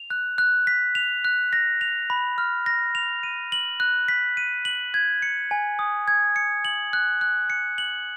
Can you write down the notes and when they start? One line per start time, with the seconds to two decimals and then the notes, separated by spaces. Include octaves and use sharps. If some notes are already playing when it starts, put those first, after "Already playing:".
Already playing: F7
0.10 F#6
0.38 F#6
0.67 B6
0.95 F7
1.25 F#6
1.53 A#6
1.81 F7
2.10 B5
2.38 F6
2.66 A#6
2.95 F7
3.23 D#7
3.52 F#7
3.80 F#6
4.08 B6
4.37 D#7
4.65 F#7
4.94 G#6
5.22 C#7
5.51 G#5
5.79 D#6
6.08 G#6
6.36 C#7
6.65 F#7
6.93 F#6
7.21 F#6
7.50 C#7
7.78 F#7